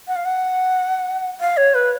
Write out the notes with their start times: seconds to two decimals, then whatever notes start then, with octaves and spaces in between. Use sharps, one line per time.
0.08 F#5
0.16 F5
0.25 F#5
1.41 F5
1.57 C#5
1.75 B4